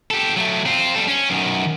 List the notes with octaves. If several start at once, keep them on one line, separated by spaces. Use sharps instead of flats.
G4 A4
F#3 A3
C4 F4
G3 A4
C#4
F#2 D#3